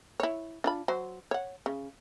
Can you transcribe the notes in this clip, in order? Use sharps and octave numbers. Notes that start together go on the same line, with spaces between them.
E4 C#5
D4 F4 B5
F#3 C5
C#5 F#5
C#3